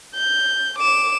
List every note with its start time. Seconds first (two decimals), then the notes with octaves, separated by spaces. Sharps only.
0.15 G6
0.78 D6 E7